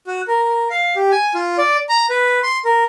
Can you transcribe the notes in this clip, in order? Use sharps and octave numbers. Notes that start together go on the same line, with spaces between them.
F#4
A#4
F5
G4
G#5
F4
D5
A#5
B4
C6
A#4